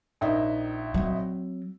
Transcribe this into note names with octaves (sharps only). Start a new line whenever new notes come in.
A#1 D#4 E5
F#3 C4